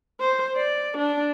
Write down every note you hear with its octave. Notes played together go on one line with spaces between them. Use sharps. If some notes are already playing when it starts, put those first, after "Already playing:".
C5
D5
D4